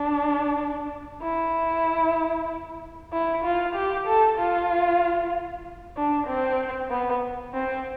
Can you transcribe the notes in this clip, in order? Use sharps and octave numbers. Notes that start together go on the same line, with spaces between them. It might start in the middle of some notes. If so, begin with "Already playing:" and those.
Already playing: D4
E4
E4
F4
G4
A4
F4
D4
C4
B3
C4